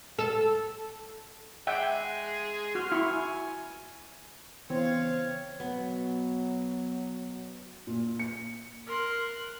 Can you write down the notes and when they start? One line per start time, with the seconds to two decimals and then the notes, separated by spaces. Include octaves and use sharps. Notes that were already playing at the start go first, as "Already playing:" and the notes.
0.19 A4
1.67 G#3 G#4 E5 F#5 G5
2.75 F#4 C6 F6
2.92 E4 C#6
3.11 G#5
4.70 C#3 E3 B3 C4 C#5 F5
5.60 B2 F#3 B3
7.87 A#2
8.19 C#7
8.86 A#4 C6 F#6